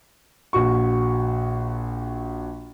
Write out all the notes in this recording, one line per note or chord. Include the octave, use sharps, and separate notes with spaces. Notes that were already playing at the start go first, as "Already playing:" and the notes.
A#1 F#4 C#6